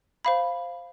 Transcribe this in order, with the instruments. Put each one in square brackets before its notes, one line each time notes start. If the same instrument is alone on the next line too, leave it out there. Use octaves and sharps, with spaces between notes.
[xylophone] C5 F5 B5